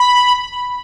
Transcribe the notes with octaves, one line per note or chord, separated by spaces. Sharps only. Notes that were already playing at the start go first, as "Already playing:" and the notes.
Already playing: B5